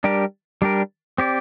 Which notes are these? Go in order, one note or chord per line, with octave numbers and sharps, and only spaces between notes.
G3 D4 G4 A#4
G3 D4 G4 A#4
C4 G4 D5